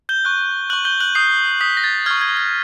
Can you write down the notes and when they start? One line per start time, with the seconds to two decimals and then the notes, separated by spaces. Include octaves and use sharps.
0.09 G6 G7
0.25 C#6 F#6
0.70 C#6 F#6 F#7
0.85 G6 G7
1.00 F#6 F#7
1.15 D#6 G6 C7
1.61 D#6 G6 B6
1.77 A#6
1.84 A6
2.06 C#6 F6 G#6
2.21 G#6
2.37 G#6